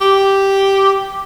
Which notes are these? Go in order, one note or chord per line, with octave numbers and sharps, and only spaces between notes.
G4